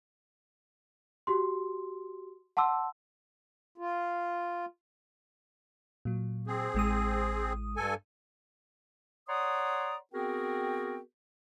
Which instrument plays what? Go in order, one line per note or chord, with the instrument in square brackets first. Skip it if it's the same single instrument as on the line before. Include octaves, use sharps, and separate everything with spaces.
[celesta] F#4 G4 C6
F#5 A5 C6 D6 E6
[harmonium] F4
[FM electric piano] A#2 F#3
[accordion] C4 G#4
[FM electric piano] A1 G#3 D#6
[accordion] G2 A4 G#5
[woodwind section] C#5 D5 F#5 A#5 C6 D#6
B3 C4 F#4 G#4 A#4 G5